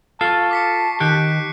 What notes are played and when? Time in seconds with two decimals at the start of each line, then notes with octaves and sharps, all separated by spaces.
0.21 F4 A4 A5 C#6 C7
0.51 D6 B6 C#7
1.00 D#3 G4 F#6 C#7 D7